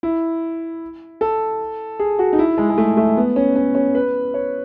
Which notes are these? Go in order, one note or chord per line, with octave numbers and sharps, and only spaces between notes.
E4
A4
G#4
F#4
D#4
E4
G#3
G#3
A3
A3
B3
C#4
C#4
C#4
B4
C#5